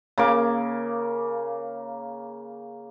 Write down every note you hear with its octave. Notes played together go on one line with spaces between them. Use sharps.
C#3 A#3 D6